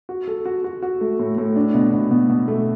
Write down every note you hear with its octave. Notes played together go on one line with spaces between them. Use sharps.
F#4
A4
F#4
F#4
F#4
A3
A2
A2
D4
B2
B2
B2
B2
A3